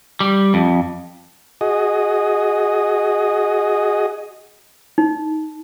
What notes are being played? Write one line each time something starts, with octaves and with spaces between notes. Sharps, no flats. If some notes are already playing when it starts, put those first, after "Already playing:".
G3
F2
F#4 G#4 D#5
D#4